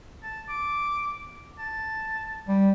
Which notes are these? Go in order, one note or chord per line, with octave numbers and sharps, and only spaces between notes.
A5
D6
A5
G3